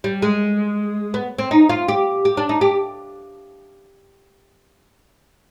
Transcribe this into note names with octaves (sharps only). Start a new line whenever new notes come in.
G3
G#3
B3
C4
D#4
F4
G4
G4
D4
D#4
G4